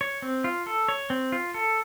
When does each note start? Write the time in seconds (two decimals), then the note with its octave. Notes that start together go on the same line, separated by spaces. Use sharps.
0.01 C#5
0.22 C4
0.44 F4
0.66 A4
0.88 C#5
1.10 C4
1.32 F4
1.54 A4